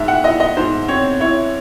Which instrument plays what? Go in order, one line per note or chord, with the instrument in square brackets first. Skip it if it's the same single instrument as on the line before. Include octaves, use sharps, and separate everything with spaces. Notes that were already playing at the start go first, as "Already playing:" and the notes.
Already playing: [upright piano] G#2 E5
F#5
E4 D#5
D#5
G#2 C5
C4 C#5
E4 C#5